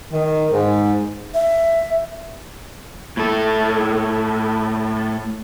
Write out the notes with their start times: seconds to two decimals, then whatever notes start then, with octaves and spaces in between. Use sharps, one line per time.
0.11 D#3
0.51 G#2
1.34 E5
3.17 A2 A4